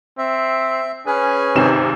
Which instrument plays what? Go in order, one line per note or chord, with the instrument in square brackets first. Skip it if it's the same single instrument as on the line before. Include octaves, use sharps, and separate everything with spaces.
[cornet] C4 [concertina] E5
[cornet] C#4 [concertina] G#4 B4 G#5
[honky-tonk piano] G#1 C3 [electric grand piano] C4 D#4 E7